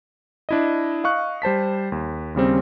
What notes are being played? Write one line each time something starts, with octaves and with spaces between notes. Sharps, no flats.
D4 E4 D#5
D#5 F5 C#6 F#6
G3 C5 A5 B6
D#2
D#2 C#3 G3 C4